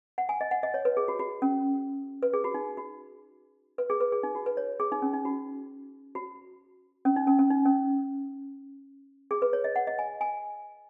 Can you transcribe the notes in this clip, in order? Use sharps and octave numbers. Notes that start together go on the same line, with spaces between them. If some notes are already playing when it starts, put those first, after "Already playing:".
F#5
G#5
D#5
F#5
D#5
C#5
B4
G#4
F#4
F#4
C#4
B4
G#4
F#4
D#4
F#4
B4
G#4
B4
G#4
D#4
F#4
B4
C#5
G#4
D#4
C#4
D#4
F#4
F#4
C#4
D#4
C#4
C#4
D#4
C#4
G#4
B4
C#5
D#5
F#5
D#5
G#5
G#5